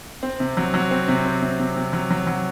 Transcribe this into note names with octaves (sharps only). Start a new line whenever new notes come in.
C4
C3
F#3
F#3
C4
C3
C4
C3
C3
C3
F#3
F#3
F#3